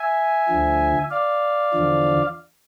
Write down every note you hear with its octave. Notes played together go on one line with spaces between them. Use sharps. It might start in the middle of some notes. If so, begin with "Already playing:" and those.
Already playing: E5 G#5
D2 D3 F3
D5 F5
E2 D3 F3